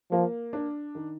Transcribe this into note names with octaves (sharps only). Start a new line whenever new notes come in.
F3 A#3
D4
D#3